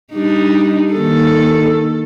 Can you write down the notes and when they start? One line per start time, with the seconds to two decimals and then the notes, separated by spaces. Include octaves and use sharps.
0.13 G3 D4 D#4
0.92 D#3 A#3 A4